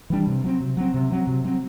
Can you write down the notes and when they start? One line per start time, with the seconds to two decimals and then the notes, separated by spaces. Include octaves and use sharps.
0.10 E3 G3 D4
0.27 C3
0.44 F#3 C4
0.60 C3
0.77 F#3 C4
0.94 C3
1.10 F#3 C4
1.27 C3
1.44 F#3 C4